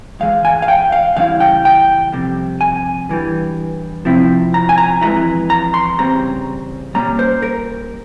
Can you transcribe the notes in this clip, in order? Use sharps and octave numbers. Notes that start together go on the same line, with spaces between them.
G#2 E3 G#3 F5
G#5
F5
G5
F5
C#3 E3 G3 C#4 E4 F5
G5
G5
F2 C3 G3
G#5
G2 E3 G3
C3 F3 C4 E4
A#5
G#5
A#5
F2 E3 G#3 C#4 E4 A#5
A#5
C6
E2 C#3 G3 C4 A#5
A#2 G3 A#3 C#4 A#5
C5
A#4